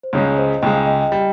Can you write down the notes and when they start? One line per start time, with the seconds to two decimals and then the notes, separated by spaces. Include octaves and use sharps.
0.03 C5
0.13 C#2 C#3 G#3 C#5
0.37 C5 D#5
0.62 C#2 C#3 G#3 D#5 G5
0.86 D#5 G5
1.12 G3